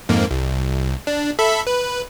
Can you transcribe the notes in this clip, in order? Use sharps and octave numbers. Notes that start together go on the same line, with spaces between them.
F2 G#2 A#3
C2
D4
A4 E5 B5
B4